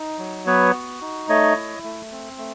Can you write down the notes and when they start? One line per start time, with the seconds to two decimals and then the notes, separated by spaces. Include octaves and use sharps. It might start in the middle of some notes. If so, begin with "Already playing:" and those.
Already playing: D#4
0.18 F#3
0.47 B3 B4 C#5
0.74 F#4
1.01 D#4
1.29 A3 C#5 D#5
1.56 E4
1.84 A3
2.12 C4
2.38 A3